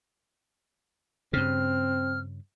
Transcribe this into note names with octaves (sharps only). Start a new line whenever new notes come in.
G2 C#3 C4 F6